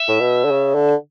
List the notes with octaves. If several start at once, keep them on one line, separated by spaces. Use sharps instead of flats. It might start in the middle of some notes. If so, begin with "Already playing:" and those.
Already playing: E5
A2
B2
D3
C#3
D3